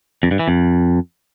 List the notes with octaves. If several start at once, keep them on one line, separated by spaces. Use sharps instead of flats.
F2
G2
E3
F2